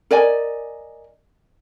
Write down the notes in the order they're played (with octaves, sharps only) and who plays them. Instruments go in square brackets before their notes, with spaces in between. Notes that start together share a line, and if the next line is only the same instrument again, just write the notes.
[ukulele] A#4 D5 D#5 G#5